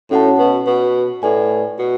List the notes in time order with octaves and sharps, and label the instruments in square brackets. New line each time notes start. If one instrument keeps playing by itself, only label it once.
[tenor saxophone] A2 [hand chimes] C#4 F#4 C#5 F#5 A5
[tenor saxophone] B2
B2
[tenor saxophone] A2 [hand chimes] E4 B4 D5 G#5
[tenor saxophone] B2